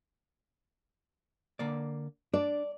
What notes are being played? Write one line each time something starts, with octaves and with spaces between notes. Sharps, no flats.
D3 A#3 D5
D4 D5